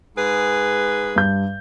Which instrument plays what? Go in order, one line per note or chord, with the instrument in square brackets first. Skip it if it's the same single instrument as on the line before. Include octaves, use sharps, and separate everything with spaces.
[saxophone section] G#2 G#4 B4
[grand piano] G2 G6